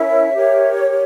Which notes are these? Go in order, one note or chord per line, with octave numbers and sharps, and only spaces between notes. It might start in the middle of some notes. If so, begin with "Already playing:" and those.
Already playing: C#4 E4 A#4 C#5 E5
G4 A#4 C#5